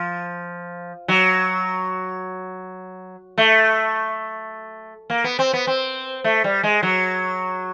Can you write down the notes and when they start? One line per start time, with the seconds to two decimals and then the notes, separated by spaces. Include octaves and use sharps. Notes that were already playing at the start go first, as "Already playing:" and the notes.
Already playing: F3
1.08 F#3
3.38 A3
5.10 A#3
5.24 B3
5.39 C4
5.53 B3
5.67 C4
6.24 A3
6.44 G3
6.63 G#3
6.83 F#3